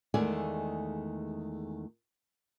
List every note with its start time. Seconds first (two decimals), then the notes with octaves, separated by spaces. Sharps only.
0.14 E2 D#3 G#3 A3 D5 G#5